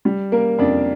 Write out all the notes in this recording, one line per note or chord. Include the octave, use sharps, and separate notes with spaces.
G3
A#3 A#4
F2 D4 D5